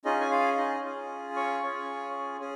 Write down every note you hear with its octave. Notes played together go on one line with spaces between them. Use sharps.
C#4 D#4 F4 G#4 D#5
G#5
F4 F5
D#4 D#5
C#4 F4 G#4
C#5 C#6
C#4 F4 G#4
C#4 G#4